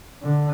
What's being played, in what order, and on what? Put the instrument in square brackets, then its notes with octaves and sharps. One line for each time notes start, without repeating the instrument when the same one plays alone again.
[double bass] D3